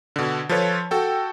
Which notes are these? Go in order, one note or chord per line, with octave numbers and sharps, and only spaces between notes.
B2 D3
F3 F4 A4 B4 C#5
F#4 A4 G5